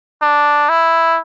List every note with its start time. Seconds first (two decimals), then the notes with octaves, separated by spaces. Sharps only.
0.22 D4
0.69 E4